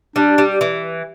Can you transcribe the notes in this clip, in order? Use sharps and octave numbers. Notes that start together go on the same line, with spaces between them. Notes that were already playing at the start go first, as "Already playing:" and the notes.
G3 D4
G3
E3